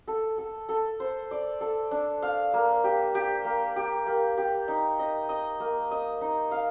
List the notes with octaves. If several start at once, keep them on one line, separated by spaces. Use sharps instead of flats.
A4
A4
A4
C5
D5
A4
D4
F5
A#3
G4
G4
A#3
G4
A#3
G4
D#4
D#5
D#5
A#3
D#5
D#4
F5